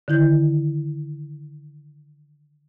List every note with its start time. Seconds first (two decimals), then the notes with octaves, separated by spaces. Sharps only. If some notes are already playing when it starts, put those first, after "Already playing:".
0.08 D3 D#3 E4 G6